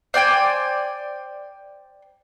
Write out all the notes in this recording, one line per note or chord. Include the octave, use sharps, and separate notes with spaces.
C5 D5 G5 G#5